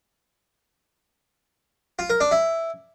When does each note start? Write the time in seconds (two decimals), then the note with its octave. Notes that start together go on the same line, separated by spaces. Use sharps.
1.99 F4
2.10 A#4
2.21 D4
2.31 E4